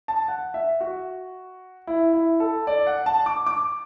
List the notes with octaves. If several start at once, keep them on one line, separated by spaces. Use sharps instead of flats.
A5
F#5
E5
F#4
E4
E4
A4
D5
F#5
A5
D6
D6